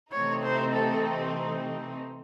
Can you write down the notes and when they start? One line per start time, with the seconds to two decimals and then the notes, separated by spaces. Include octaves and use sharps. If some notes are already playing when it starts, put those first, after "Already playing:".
0.12 C3 E3 A3 C4 D#4 C#5
0.43 C5
0.74 A4